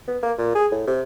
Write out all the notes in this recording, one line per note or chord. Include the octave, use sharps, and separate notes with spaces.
B3
A#3
A#2
G#4
A2
C3